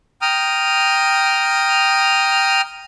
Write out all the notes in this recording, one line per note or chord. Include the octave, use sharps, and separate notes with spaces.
G5 A#5 D#6 F6